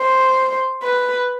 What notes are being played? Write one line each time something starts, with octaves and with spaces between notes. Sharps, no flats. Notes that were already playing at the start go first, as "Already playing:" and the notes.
Already playing: C5
B4